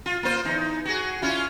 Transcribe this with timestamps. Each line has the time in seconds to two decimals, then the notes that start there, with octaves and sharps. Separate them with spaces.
0.06 F4
0.23 A#3 F4 C5
0.45 E2 D#4
0.85 F#4 G#4
1.22 C#4 E4 F4